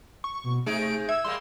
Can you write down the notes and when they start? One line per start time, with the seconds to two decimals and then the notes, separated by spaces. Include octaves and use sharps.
0.24 C#6
0.44 B2
0.66 C3 A3 D#4 G#4 D7
1.09 E5 E6 G#6
1.24 G3 G#3 A#3 C6